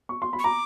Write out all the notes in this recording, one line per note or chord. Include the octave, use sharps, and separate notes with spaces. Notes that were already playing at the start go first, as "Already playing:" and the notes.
C#6
C6
B5
C#6
A#5 D6